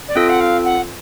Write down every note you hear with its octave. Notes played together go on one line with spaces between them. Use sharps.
D5
C4 F4 A4 D#5
F#5
F5
F#5